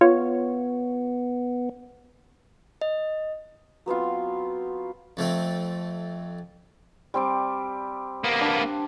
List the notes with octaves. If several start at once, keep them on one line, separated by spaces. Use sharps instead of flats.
B3 F4 C#5
D#5
F#3 B3 C4 F4
F2 A3 C4
G3 C4 D5
A#3 B3
D4